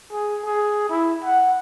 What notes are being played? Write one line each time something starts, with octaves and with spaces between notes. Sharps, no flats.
G#4
G#4
E4
F#5